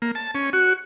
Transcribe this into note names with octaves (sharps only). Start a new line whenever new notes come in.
A#3
A5
C#4
F#4